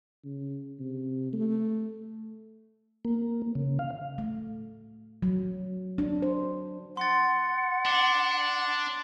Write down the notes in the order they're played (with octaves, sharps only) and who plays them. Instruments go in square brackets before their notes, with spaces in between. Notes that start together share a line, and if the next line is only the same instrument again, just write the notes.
[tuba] C#3
C3
A3
[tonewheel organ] A#3
C#3
F5
[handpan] A3
F#3
D4
C5
[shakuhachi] F#5 [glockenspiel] C6 A6
[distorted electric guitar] D4 [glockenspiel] C6 D6 A6